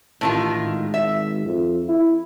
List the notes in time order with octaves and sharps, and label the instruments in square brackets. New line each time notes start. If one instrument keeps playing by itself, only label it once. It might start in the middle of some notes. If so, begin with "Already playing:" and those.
[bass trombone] A1 [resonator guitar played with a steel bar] A2 D#3 F4
[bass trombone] G#1
[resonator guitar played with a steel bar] E5
[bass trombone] F2
E4